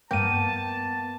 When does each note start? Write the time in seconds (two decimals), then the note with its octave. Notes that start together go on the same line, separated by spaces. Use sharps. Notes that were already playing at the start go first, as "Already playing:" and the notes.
0.11 G2 A#3 B3 G5 A5 D#7